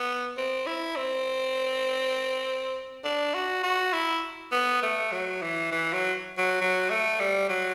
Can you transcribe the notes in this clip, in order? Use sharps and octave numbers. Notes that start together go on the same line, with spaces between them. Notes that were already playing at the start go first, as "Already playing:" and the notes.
Already playing: B3
C4
E4
C4
D4
F#4
F#4
E4
B3
A3
F#3
E3
E3
F#3
F#3
F#3
A3
G3
F#3